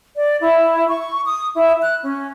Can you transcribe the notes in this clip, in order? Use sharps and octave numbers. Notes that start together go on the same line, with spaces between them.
D5
E4
C#6
D#6
E4
F#6
C#4